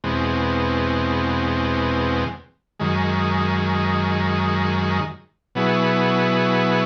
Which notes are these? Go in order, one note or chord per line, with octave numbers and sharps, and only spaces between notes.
E2 B2 G#3 C4
F#2 D#3 G#3
B2 F#3 B3 E4 G#4